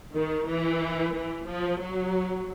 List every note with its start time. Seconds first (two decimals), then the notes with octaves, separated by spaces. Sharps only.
0.14 D#3
0.47 E3
1.15 E3
1.47 F3
1.81 F#3